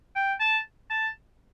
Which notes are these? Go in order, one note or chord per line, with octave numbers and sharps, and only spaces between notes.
G5
A5
A5